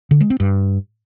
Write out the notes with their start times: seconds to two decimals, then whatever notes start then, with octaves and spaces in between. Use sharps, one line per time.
0.11 D3
0.21 G#3
0.30 C4
0.40 G2